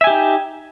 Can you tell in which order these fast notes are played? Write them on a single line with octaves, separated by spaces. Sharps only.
E5 G#5 G4 D#4